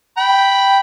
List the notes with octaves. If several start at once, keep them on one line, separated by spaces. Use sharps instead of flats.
G5 B5